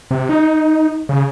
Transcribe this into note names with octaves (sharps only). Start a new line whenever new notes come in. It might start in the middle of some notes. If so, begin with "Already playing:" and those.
C3
D#4
C#3